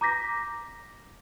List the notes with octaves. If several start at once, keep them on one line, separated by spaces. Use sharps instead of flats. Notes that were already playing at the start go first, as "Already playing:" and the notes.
A#5 D6 G6 A#6 B6